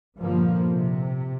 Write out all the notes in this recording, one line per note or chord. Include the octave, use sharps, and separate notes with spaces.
G2 A#2 D3 F3 A#3
C3